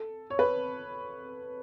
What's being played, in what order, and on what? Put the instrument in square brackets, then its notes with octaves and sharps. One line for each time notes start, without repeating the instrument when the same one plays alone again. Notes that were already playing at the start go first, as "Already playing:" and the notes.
Already playing: [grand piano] A4
C#5
B4